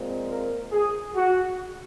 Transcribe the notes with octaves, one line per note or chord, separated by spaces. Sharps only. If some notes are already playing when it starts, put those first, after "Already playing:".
Already playing: A#2 G#3 C4
A#4
G#4
F#4